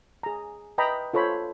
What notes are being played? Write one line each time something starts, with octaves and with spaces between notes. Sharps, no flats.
G#4 A#5
B4 D#5 G5 A#5 B5
F4 A4 C5 C#5 B5